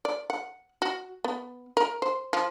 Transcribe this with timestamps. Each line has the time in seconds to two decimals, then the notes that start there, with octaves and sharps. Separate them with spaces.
0.05 D5
0.30 F#5
0.82 F#4
1.24 B3
1.77 A#4
2.02 C5
2.33 F3